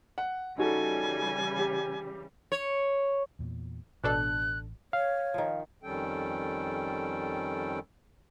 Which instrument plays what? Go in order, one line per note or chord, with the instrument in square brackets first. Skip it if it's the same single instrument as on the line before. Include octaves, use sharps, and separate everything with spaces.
[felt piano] F#5
[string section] C#3 E3 G3 [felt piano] D#4 F#4 A4 [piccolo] G#5
[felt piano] G4
[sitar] C#5
[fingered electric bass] E2 A#2
[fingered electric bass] A1 [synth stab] B2 D4 A4 [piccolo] F#6
[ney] C#5 [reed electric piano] F5
[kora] D#3 F3
[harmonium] F2 D#3 G3 C#4 A4 G5